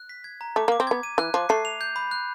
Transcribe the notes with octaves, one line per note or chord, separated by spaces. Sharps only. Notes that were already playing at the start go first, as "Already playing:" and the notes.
Already playing: F#6
B6
G#6
A#5
A3 D6
A#3
D6
C4
B3 G#6
D#7
E3 F#6
F3 D6
A3 C7
F7
G6
B5
F#6